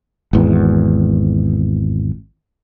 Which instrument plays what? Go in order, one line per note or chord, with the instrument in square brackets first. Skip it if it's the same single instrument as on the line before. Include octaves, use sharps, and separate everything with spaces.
[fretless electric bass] G#1 E2